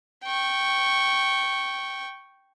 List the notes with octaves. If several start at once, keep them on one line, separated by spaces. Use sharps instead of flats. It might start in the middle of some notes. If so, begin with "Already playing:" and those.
G5 C#6